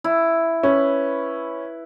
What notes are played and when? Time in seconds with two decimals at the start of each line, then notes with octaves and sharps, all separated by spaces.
0.04 E4
0.63 C#4 B4